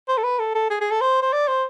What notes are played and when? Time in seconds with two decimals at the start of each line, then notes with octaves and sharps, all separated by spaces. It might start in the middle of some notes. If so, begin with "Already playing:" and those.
0.08 C5
0.17 A4
0.23 B4
0.39 A4
0.55 A4
0.70 G#4
0.81 G#4
0.91 A4
1.01 C5
1.22 C5
1.32 D5
1.48 C5